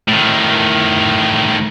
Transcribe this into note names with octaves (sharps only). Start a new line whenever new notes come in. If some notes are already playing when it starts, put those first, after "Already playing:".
A2 D#3